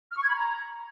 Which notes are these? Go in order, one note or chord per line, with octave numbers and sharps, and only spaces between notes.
F6
C#6
G#6
B5
A#5